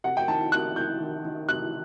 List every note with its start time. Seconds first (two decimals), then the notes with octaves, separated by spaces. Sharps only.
0.04 C3 F#5
0.17 G5
0.28 D#3 A5
0.52 C2 F#6
0.76 C2 G6
1.00 D#3
1.25 D#3
1.48 C3 F#6